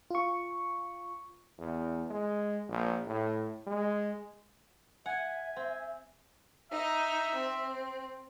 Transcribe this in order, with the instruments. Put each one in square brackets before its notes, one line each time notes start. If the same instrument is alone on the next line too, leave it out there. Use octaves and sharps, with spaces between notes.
[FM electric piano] F4 C#6
[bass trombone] E2
G#3
A#1
A2
G#3
[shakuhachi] E5 [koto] F#5 [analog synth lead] G#5
[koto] C4
[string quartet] D#4 [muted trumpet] E5
[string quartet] C4